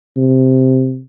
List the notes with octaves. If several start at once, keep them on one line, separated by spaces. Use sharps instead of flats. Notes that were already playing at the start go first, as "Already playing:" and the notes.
C3